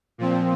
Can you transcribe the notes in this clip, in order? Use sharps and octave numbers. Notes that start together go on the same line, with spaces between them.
A#2 F3 C4